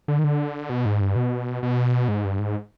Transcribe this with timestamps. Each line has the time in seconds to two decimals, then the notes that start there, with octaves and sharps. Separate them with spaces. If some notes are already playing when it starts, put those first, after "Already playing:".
0.08 D3
0.19 D#3
0.24 D3
0.70 B2
0.86 G#2
1.01 G2
1.16 B2
1.63 B2
2.08 G#2
2.25 G2
2.39 G#2